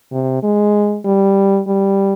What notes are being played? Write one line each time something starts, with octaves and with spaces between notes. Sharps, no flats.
C3
G#3
G3
G3